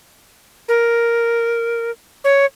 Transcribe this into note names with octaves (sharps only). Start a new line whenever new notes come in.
A#4
C#5